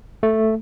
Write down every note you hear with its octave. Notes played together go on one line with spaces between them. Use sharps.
A3